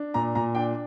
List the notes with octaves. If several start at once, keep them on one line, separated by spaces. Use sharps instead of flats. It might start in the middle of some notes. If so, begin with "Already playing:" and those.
Already playing: D4
A#2 A#5
A#2 A#5
D4 G5